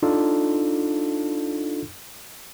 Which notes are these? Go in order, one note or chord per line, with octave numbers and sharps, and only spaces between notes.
D4 D#4 F4 A4